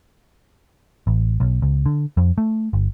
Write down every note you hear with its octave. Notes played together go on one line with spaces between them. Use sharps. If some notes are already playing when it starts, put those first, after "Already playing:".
A1
B1
C#2
D3
F2
A3
G1